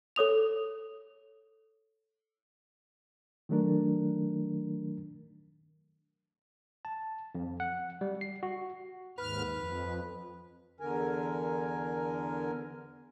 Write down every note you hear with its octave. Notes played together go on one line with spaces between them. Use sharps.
A4 C#5 D#6 F7
D#3 F#3 A3 D4 A#4
A5
F2
F#5
G3
C7
F#4
D#2 G#2 B4 F6
F2
E2 D3 A#4 G#5